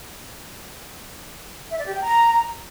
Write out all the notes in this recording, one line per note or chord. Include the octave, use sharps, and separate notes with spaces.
E5
D5
G4
G5
A#5